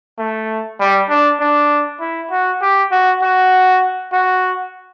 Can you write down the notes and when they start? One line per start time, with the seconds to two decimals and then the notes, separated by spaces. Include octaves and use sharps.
0.19 A3
0.80 G3
1.09 D4
1.40 D4
2.00 E4
2.31 F#4
2.62 G4
2.91 F#4
3.22 F#4
4.12 F#4